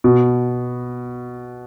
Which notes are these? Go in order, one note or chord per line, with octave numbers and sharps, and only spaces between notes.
B2